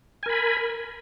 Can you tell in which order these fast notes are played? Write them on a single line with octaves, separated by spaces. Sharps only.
G#5 A#4 B5